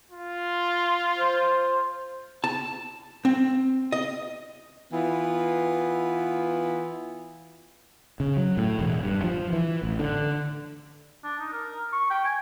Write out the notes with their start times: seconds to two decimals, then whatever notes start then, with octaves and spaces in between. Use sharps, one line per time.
0.11 F4
1.18 C5
2.44 A5
3.25 C4
3.92 D#5
4.92 E3 B3 F4
8.20 C#3
8.37 F#3
8.57 A2
8.79 E1
9.03 G2
9.24 F3
9.53 E3
9.83 A1
9.99 D3
11.24 D4
11.40 D#4
11.53 A#4
11.93 C#6
12.10 G5
12.25 G#5